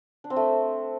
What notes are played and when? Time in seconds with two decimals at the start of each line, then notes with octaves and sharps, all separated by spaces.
0.24 D4
0.30 C4
0.36 A3